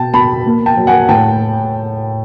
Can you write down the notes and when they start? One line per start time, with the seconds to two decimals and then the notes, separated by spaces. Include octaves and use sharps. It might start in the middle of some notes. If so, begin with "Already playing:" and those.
Already playing: B2 G5 A5
0.14 B2 A5 B5
0.46 A#3
0.66 G5 A5
0.77 F#3
0.87 F#5 G#5
1.09 A2 G5 A5